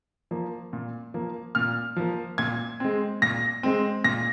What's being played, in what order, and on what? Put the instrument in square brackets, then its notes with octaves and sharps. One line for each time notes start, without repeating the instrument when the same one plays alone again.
[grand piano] F3 A#3
A#2
F3 A#3
A#2 F6
F3 A#3
A#2 G#6
G#3 C4
A#2 A#6
G#3 C4
A#2 A#6